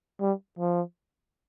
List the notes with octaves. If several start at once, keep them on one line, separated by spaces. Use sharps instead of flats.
G3
F3